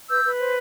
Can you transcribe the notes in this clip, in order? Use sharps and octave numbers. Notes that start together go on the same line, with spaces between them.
B4 E6 G6
B4
C5